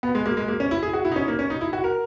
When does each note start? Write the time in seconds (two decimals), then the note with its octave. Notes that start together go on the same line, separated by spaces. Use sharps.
0.03 B3
0.15 G#3
0.26 A#3
0.37 G#3
0.48 A#3
0.60 C#4
0.71 E4
0.82 G#4
0.93 F#4
1.05 E4
1.12 D#4
1.16 C#4
1.28 A#3
1.39 C#4
1.50 D#4
1.61 E4
1.73 F#4
1.84 A#4